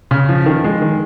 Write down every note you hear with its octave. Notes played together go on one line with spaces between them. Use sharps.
C#3
F3
D#3
G#3
D#3